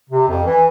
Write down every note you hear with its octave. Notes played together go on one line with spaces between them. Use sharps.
C3
F2
E3